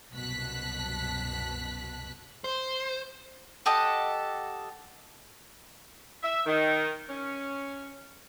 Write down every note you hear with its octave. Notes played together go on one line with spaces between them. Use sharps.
C2 F#2 B2 A5 F#6 B6
C5
G4 A4 D#5 F#5
E5
D#3
C#4